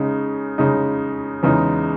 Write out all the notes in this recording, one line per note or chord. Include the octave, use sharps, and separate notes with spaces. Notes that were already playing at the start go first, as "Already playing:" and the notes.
Already playing: C#3 G#3 D#4
C#3 G#3 D#4
E2 C#3 G#3 D#4